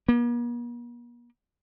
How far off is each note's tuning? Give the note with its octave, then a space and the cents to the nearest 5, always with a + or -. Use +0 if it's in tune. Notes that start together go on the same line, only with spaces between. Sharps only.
A#3 +45